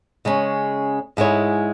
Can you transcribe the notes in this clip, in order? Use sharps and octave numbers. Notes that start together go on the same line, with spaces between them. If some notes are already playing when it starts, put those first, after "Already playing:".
C#3 G#3 C#4
G#2 G#3 E4 C#5